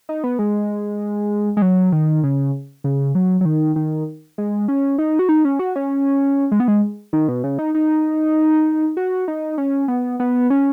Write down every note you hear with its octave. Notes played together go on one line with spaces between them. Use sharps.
D#4
B3
G#3
G#3
F#3
D#3
C#3
C#3
F#3
F#3
D#3
D#3
G#3
C#4
D#4
F#4
D#4
C#4
F#4
C#4
G#3
B3
G#3
D#3
B2
C#3
D#4
D#4
F#4
D#4
C#4
B3
B3
C#4